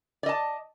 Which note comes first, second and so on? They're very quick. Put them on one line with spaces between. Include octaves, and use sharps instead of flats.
D5 D#5 A5